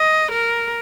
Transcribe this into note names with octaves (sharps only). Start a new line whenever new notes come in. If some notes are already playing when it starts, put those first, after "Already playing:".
Already playing: D#5
A#4